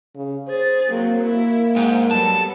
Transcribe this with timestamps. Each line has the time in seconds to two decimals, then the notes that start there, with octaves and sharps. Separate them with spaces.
0.15 C#3
0.47 G#4 C5 A6
0.90 F#3 A#3 C4
1.25 A#3 E4
1.76 G#2 G5
2.11 F#3 G3 B3 A4 A5